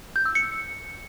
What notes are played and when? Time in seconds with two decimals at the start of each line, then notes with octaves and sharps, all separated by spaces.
0.16 G6
0.26 E6
0.35 C#7